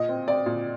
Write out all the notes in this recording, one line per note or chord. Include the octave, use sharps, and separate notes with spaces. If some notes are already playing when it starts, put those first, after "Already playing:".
Already playing: A#2 D#5
C4
C4 D5
A#2